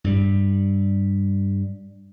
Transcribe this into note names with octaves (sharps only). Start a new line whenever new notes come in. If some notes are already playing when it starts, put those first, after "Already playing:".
G2 G3